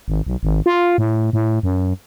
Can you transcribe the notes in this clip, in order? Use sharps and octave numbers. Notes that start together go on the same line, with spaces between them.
G#1
B1
G#1
F4
A2
A2
F#2